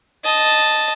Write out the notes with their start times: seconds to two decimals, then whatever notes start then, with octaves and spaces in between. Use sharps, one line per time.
0.24 D#5 A5